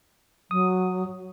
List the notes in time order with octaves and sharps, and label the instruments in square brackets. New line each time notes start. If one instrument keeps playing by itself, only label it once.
[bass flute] F#3 [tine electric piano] D#6